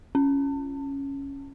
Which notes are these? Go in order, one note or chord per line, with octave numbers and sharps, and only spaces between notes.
C#4